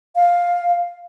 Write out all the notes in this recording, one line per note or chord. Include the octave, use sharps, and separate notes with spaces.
F5